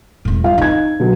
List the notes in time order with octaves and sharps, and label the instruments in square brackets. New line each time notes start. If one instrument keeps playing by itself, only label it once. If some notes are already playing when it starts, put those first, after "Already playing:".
[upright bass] E1 A2
[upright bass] F#3 G3 [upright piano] F4 F5
[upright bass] E3 D4 [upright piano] D#4 G#6
[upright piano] B2 D3 F#3